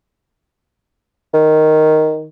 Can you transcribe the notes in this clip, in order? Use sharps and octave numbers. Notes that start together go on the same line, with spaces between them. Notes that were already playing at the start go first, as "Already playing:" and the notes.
D#3